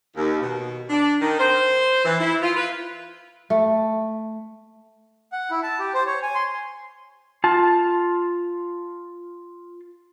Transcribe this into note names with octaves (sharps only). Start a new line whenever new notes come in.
D#2
B2
D4
D#3
C5
E3
E4
F4
B4
A3
F#5
E4
A5
G4
C5
C#5
G#5
C6
F4 A5